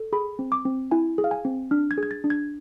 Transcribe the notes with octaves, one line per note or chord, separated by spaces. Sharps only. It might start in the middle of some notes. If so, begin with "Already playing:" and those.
Already playing: A4
G#4 B5
C4
D6
C4
E4 G#5
G#4
F5
G#5
C4
D4 F6
G#6
G#4
G#6
A6
D4
G#6